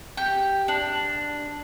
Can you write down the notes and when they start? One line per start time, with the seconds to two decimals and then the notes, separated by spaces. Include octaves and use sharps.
0.17 G4
0.68 D4